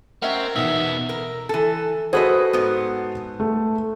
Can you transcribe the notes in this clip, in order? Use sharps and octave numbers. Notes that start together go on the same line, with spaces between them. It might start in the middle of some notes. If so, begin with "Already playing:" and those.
C4 C#4 A#4 E5 F#5
E2 B2 E3 B3 D#4 E5 F#5
A#4
E3 A4
F#4 G#4 A4 B4 C5 D#5
G#2 B3
A3